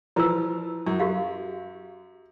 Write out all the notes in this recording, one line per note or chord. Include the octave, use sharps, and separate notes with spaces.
E3 F3 E4 B4 E6
F#2
F#4 G4 F5